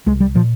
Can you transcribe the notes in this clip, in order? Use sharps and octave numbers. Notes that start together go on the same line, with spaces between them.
C2 G#3
G3
A#2 F3